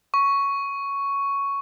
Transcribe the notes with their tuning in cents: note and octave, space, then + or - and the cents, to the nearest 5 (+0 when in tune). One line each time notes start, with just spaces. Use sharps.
C#6 +5